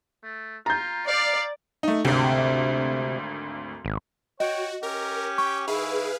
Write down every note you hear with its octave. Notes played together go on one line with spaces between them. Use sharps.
A3
F4 A#5 G6
D5 F5
A3 D#4
G#1 D2 C3
G#1
F#4 C#5 D#5 G5
C#4 G4 A#4
G5 C#6
D#3 E4 G#4 B4 F5